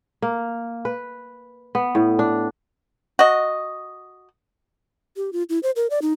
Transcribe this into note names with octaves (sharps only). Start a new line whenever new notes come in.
A#3
B4
B3
A2
D4
F#4 D#5
G4
F4
E4
C5
A#4
D5
D#4